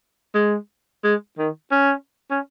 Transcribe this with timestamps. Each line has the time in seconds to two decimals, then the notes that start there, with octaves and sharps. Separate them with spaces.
0.35 G#3
1.04 G#3
1.38 D#3
1.71 C#4
2.31 C#4